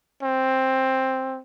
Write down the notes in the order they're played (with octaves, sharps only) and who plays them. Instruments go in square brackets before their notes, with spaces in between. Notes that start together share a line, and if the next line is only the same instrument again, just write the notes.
[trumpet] C4